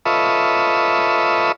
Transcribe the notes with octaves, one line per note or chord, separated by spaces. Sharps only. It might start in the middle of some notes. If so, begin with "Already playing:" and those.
F4 A4 B4 C#5 D#5 E5